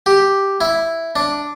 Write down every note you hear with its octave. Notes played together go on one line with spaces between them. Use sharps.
G4
E4
D4